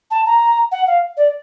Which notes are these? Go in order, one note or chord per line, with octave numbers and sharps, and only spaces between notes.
A5
A#5
F#5
F5
D5